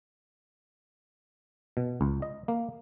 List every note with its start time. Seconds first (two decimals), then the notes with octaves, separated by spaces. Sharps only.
1.77 B2
2.01 C#2
2.22 D#5
2.48 A#3